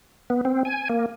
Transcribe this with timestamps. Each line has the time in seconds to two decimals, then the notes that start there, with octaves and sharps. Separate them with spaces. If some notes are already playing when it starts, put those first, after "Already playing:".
0.30 B3
0.45 C4
0.65 G#5
0.89 A#3